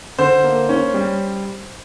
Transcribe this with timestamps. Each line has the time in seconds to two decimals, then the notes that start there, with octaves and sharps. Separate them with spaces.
0.18 D3 C5
0.44 A#3
0.69 C#4
0.94 G3